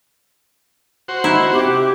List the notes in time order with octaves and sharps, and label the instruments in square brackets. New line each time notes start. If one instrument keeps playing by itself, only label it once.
[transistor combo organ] F#4 C5
[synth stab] D#4 [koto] E4
[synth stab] C3 [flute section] G4 D6